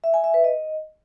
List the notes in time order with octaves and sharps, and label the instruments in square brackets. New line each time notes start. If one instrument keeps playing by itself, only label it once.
[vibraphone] E5
G#5
E5
B4
D#5